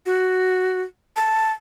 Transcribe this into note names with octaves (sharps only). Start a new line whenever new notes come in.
F#4
A5